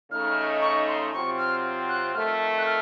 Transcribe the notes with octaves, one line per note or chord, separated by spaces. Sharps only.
C#3 A3 D#4 F6
C#6
C6
C3 F#3 C4 F4 C#6
F6
F#6
F2 D#3 A3 F6
F#6
F6